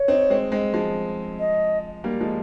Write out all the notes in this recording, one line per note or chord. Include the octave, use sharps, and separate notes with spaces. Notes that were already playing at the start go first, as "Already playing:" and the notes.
Already playing: C#5
C4 D#4
G#3 C4
G#3 C4
F3 G#3
D#5
G3 A#3
F3 G#3